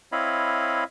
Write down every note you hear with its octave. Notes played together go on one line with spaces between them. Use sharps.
C4 E4 C#5 D#5 F5 B5